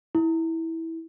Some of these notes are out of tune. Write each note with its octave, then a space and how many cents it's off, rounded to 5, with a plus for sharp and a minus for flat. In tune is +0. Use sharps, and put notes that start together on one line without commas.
E4 -15